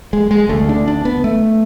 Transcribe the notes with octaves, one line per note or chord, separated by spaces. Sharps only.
G#3
G#3
D2 D3 A3
D4
D4
B3
A3